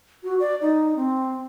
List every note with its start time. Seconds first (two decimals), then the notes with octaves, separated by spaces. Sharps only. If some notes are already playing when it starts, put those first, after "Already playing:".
0.24 F#4
0.40 D5
0.62 D#4
0.96 C4